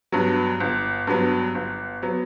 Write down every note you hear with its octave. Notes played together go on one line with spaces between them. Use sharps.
G2 F#3 B3
G1
G2 F#3 B3
G1
F#3 B3